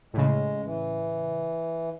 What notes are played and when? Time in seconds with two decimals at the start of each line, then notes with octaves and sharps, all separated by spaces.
0.14 A2 C#3 G#3
0.64 E3